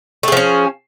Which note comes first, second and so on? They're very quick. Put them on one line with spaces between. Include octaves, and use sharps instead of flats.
A3 G#4 F3 C#4